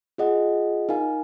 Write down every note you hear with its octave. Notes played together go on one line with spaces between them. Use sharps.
F4 G#4 D#5 F#5
D#4 A#4 F5 G#5